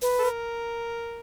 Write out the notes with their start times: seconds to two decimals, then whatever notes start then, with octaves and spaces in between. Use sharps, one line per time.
0.02 B4
0.19 A4
0.24 A#4